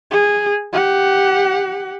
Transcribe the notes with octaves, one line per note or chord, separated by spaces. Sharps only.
G#4
G4 F#5